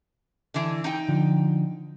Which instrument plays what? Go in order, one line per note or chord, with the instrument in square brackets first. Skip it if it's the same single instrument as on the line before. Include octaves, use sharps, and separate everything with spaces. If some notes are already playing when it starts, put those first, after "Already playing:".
[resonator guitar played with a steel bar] D3 E3
D#4 G5
[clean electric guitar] D3 F3